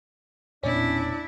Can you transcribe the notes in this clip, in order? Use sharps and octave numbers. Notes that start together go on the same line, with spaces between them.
E1 A#2 B3 C#4 D4 E4 D5